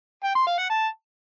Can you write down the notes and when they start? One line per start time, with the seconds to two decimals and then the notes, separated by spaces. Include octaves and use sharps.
0.24 G5
0.35 C6
0.47 F5
0.58 F#5
0.70 A5